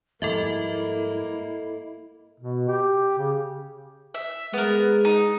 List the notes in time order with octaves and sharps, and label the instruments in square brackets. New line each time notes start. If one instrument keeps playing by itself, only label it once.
[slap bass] G#2 F3 G3 [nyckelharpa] A#3 [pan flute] E4 [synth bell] A4 D#5 E5
[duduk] B2
G4
C#3
[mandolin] E5
[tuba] G#3 [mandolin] B3 A#4
[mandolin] D#4